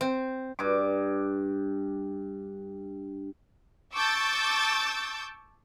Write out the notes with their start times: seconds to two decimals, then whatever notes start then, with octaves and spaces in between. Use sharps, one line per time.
0.01 C4
0.59 G2 D6
3.93 A5 C#6 D6 E6 G6 A6